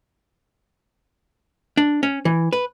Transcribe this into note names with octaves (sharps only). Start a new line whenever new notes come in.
D4
C#4
E3
B4